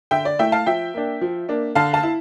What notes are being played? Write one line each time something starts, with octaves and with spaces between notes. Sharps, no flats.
D3 E5 G5
D5
A3 E4 E5 G5
F5 A5
F3 E5 G5
A#3 D4
F3
A#3 D4
D3 F5 A5
F5 A5
E4